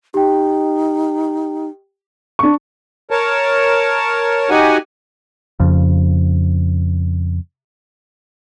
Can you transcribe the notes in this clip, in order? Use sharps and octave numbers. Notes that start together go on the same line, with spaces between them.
D#4 G4 G5
D4 C#6
A#4 C#5 A5
D#4 F#4 G4 F#5 G#5
F2 C#3